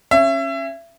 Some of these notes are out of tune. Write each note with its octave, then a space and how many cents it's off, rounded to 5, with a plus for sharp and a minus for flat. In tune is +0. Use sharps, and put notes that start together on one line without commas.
C#4 -20 E5 +30